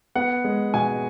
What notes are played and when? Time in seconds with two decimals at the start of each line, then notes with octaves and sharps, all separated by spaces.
0.16 B3 F#5
0.44 G#3
0.74 B2 G#5